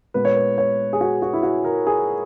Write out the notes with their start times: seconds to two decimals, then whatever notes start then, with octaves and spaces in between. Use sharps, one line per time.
0.14 A#2 G#3 B3 B4
0.25 C#5
0.35 B4
0.58 C#5
0.93 G#4
1.01 F#4
1.22 F#4
1.33 E4
1.43 F#4
1.64 A#4
1.87 G#4